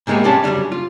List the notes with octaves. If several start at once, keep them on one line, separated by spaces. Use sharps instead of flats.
G#2 C3 G#3 A#3 B3
C3 G3 C#4 A5
F#2 C#3 G3 D4
F4